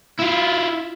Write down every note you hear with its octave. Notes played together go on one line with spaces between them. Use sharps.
E4 F4